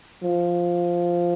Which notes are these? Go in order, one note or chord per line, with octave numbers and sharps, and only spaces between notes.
F3